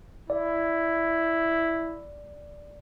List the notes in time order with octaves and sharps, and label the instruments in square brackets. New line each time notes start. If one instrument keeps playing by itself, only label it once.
[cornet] E4 [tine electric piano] D5